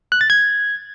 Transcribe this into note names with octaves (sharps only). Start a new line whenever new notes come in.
F#6
A6
G#6